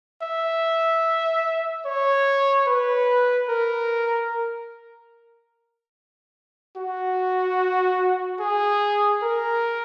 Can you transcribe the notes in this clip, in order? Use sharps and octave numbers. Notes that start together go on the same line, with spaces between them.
E5
C#5
B4
A#4
F#4
G#4
A#4